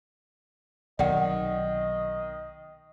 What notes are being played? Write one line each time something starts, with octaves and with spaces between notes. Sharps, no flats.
B1 C3 D#3 D5 D#5 F#5